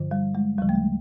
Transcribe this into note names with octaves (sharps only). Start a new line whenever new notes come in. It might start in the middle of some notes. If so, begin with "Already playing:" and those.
Already playing: G2 D3 F3
G3
G#3
D2 C#3 F3 G3
A3
G#3